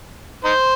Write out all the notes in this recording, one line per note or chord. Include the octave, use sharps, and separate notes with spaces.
D#4 C5